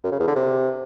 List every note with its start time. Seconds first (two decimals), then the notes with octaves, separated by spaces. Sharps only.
0.04 F#2
0.12 C#3
0.20 E2
0.28 D3
0.36 C3